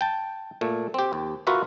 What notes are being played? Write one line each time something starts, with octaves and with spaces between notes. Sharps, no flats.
G5 A5
A#2 A3
C4 G4
D#2
F4 F#4 A#4 B4 E5 F#5